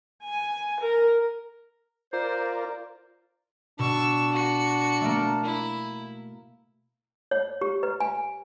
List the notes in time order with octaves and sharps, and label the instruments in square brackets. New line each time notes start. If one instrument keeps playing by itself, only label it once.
[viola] G#5
A#4
[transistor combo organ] F4 A#4 D5 [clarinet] C5
[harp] B2 [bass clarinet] D4 [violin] C#6 E6
[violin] F#4 C#7
[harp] A3 A#3
[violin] E4
[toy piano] C#5
G4
B4
G#5